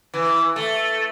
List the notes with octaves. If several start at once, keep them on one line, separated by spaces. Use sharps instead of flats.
E3
A3